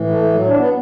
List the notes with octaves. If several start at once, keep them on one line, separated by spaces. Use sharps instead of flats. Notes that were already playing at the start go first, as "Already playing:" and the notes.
Already playing: A2 E3
A3
A3
F#3
D4
B3